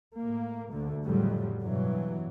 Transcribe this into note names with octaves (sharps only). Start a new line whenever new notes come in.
A2 A#3
D2 D3
F2 A2 C#3 F#3 G3
G2 B2 E3 F#3